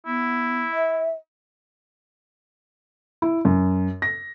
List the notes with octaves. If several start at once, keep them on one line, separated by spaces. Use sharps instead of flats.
B3 E4
E5
E4
F#2
A#6